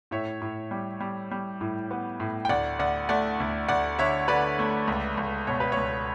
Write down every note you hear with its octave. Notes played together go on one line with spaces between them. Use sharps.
A2 C#5 E5
A2
G3
G3
G3
A2
B3
A2
G5
D2 D5 F#5
D2 D5 F#5
A3 D5 F#5
D2
D2 D5 F#5
D3 C#5 E5
D3 B4 D5
A3
C#2
C#2
B2 C#5
B4
C#2 C#5